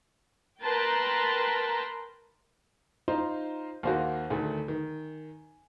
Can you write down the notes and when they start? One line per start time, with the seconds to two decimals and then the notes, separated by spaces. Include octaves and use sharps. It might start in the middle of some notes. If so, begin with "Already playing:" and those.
0.62 A#4 B4 G5 A5 A#5 C6
3.08 D#4 F4 C5
3.83 D#2 D#3 A#3 F#4 C5 F5
4.30 D2 D#3 A3 G#5
4.68 D#3